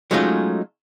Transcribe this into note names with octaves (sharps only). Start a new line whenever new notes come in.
F#3 G#3 A3 C#4 D#4 F4